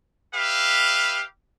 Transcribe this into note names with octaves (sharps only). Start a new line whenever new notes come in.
G4 B4 E5 F5